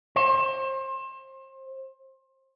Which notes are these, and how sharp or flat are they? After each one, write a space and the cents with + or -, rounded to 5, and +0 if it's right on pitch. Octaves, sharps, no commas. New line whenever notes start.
C5 +30